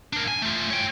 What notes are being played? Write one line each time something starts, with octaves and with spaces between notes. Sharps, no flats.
D4 A#4
G#5
A3 F4
C#5 G5